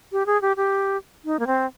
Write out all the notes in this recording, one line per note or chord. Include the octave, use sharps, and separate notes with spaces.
G4
G#4
G4
G4
D#4
A#3
C4